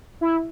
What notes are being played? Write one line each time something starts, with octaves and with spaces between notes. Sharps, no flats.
E4